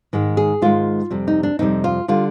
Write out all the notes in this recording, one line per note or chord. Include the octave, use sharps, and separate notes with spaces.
G#2 D#3 G#3
G#4
G#2 D#3 G#3 F4
F2 C3 G3
D#4
D4
F2 C3 G3 D#4
F4
D3 G3 F4